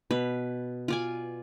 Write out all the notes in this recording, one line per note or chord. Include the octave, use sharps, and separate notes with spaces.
B2 B4
F4 D5 G#5